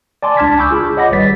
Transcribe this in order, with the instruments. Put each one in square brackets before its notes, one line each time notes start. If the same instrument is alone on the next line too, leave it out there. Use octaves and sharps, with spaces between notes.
[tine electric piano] D5 G#5 A5 C6 D6
C#2 D4 A5 F6 G#6 B6
G#5 B5 C#6 D6 E6 G6
F4 G#4 B5
C#5 D#5 F#5 B5 D6 A#6
G#1 G3 B4 A6 B6